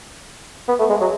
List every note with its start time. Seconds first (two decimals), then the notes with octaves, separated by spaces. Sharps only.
0.68 B3
0.79 A3
0.90 G#3
1.01 F#3